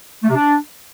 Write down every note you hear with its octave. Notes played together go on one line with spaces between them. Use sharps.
A3
C3
D4